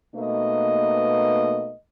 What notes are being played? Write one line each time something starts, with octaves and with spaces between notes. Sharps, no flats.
B2 A3 A#3 D#4 B4 D#5